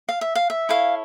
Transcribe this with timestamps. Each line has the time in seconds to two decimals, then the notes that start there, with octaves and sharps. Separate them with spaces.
0.09 F5
0.21 E5
0.35 F5
0.50 E5
0.69 E4 A4 C#5 F5